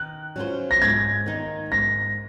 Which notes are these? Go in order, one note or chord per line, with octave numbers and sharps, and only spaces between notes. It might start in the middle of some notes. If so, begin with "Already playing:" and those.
Already playing: D#3 F#6
F#3 C#4 F4 C5
A#6
G#2 G#6
D#3 A#3 D#4
G#2 A#6